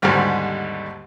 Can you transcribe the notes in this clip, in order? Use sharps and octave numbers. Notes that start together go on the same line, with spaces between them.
G#1 D#2 G#2 D3 G3 F6